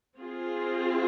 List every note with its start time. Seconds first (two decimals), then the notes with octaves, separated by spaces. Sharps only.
0.18 C4 F4 G#4